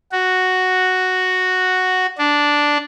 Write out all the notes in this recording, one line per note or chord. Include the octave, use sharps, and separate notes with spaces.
F#4
D4